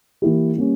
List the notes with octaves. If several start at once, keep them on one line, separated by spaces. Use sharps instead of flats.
E3 A#3 E4 G4
G3 A#3 C#4